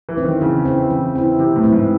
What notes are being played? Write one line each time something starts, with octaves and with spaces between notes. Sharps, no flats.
E3
C4 E4
D#3
C#3 E3
C4 E4
E3
C4 E4
C3 E3
A2
C4 E4
G#2